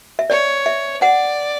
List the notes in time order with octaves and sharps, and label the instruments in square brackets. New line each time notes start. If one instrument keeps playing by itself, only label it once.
[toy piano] E5
[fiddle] C#5 [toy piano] D5
[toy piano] E5
[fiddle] D5 [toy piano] F#5